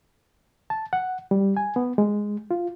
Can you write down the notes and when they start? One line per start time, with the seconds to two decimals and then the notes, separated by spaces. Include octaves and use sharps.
0.70 A5
0.93 F#5
1.31 G3
1.57 G#5
1.76 B3
1.98 G#3
2.51 F4